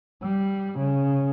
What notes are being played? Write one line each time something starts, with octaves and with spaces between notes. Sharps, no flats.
G3
C#3